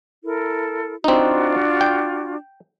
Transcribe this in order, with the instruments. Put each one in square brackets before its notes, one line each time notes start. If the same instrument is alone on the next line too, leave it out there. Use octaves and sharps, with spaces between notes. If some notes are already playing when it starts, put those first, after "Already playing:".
[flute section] E4 A4 A#4
[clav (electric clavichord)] C4 D#4 [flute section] D4 F4 F#4
[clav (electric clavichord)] G5